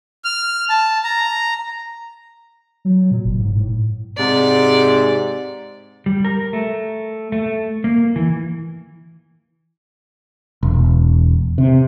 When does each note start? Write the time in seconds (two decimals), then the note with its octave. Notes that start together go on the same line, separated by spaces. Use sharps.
0.25 F6
0.69 A5
1.04 A#5
2.85 F#3
3.11 A#2
3.24 F#1
3.38 G#2
3.56 A2
4.18 G#2 C3 D5
6.06 G3
6.25 A#4
6.53 A3
7.32 A3
7.84 A#3
8.16 E3
10.63 E1
11.58 C3